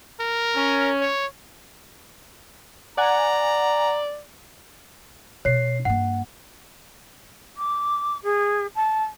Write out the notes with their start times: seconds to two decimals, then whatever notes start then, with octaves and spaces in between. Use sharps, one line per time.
0.20 A#4
0.56 C#4
1.01 C#5
2.98 D5 F#5 G#5 A#5
5.45 B2 C#5 C7
5.85 G2 A#3 F#5
7.57 D6
8.23 G#4
8.75 A5